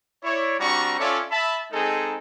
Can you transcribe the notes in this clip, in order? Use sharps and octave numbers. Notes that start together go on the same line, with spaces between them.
E4 C#5 D5
G3 C4 D4 F#4 A#5 C#6
C#4 F4 A4 C#5 D5 E5
E5 A5 B5
G#3 C4 D#4 G#4 A4